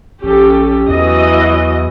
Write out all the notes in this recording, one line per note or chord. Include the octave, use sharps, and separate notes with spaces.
A#1 C#4 G4 A4
E2 E3 F#3 D#5